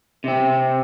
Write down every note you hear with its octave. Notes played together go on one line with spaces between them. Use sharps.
C3 C4